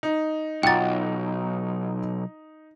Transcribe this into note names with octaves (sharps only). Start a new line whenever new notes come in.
D#4
B1 F4 F#5 G5 A#5 A6